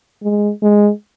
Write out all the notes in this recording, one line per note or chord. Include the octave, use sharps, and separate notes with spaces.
G#3
G#3